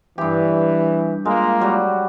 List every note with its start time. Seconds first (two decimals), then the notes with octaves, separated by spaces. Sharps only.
0.18 G2 E3 G4
1.25 G#3 A#3 F4 A#4
1.60 F#3 G3 F#4